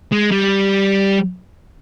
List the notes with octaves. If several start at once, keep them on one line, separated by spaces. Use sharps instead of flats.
G#3
G3